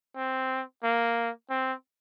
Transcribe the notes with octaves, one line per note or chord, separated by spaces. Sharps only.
C4
A#3
C4